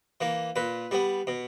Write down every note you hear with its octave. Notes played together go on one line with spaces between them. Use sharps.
E3 A#3
A#2 B4
G3 B3
B2